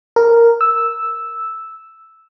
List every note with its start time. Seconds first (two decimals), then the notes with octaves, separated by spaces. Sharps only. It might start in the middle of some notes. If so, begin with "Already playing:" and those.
0.16 A#4
0.61 E6